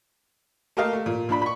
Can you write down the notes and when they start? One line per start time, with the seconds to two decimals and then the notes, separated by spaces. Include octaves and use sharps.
0.77 A3 G4 A#4 D#5 F5
0.93 A3
1.06 A#2
1.29 A#2 D4 B5
1.42 B5 C#6